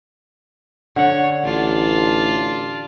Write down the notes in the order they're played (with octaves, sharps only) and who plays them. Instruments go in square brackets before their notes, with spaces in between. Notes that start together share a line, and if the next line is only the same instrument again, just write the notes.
[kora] D3 F#5 [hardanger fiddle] C#5
[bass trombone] A1 [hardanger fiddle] D4 F4